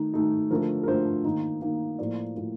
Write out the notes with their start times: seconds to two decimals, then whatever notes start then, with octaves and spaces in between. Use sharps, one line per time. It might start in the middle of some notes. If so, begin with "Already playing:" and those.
Already playing: D#3 A3 D#4
0.14 D#3 A3 D#4
0.51 D3 F3 A3 A#4
0.83 A#4
0.88 D3 F3 A3 C5
1.25 D#3 A#3 D#4
1.61 D#3 A#3 D#4
1.99 A2 F3 A#3 F4 D5
2.36 A2 F3 A#3 F4